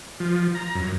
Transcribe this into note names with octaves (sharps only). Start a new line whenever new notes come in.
F3
A#5
F#2